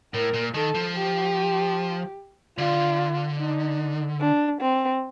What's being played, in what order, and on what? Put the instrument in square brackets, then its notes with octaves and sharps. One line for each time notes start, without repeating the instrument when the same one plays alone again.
[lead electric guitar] A2 [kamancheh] A#4
[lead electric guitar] A#2
[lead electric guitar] D#3 [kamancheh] A4
[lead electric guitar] F3
[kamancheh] G4
[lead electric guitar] D3 [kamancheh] F4
[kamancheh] D#4
D4
C4